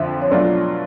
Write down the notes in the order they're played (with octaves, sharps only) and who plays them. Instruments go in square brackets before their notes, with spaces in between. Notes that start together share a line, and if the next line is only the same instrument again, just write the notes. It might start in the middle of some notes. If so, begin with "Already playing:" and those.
Already playing: [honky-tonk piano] F2 D3 F3 [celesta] E5
[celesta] C#5
[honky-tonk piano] B2 F#3 A3 D4 F4 [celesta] D5